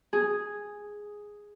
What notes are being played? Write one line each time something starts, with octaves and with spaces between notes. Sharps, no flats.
G#4